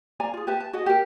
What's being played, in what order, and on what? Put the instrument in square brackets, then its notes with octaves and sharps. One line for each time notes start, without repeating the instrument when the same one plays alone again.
[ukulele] D5 F5 G#5 A#5
F4 G#4
G4 B4 E5 A5
A5
F#4 G#4 D#5 F#5
G4 A#4